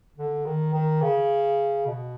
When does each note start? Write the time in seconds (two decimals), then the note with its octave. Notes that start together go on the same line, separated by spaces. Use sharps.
0.18 D3
0.46 D#3
0.74 D#3
1.02 C#3
1.87 B2